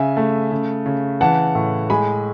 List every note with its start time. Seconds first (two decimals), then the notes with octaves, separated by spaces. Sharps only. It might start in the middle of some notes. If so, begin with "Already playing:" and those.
Already playing: C#3 E5 G#5
0.17 A3
0.51 C#3
0.86 C#3
1.21 E3 F#5 A5
1.55 A2
1.90 G#3 G#5 B5